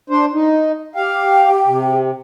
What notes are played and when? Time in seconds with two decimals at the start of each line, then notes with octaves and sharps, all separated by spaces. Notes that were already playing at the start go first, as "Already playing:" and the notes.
0.10 D4 C5
0.34 D#4
0.95 G4 F5 G5
1.67 C3